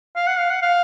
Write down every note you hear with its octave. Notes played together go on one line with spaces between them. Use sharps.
F5
F#5
F5
F#5
F5